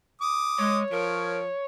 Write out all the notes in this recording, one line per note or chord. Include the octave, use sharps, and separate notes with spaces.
D6 D#6
G#3 C#5
F3 A#4